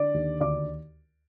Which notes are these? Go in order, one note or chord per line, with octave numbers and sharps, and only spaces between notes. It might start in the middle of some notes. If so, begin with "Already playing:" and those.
Already playing: D3 D5 D6
D#2
D2 D5 D6